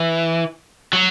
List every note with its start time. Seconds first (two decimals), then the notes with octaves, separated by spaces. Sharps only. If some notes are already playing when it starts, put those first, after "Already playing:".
Already playing: E3
0.93 F#3